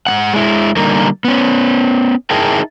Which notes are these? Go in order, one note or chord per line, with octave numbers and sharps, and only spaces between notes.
G#2 G#3 F#5
G#3 E4
D3 G3 A#3 D#4 A#4
B3 C#4
D#4 E4 G#4 A#4 G5 A5